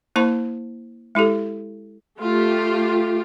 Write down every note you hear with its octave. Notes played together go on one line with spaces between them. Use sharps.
A#3 E4 C5 A5 C#6
G#3 E4 G4 A4
A3 F4 G4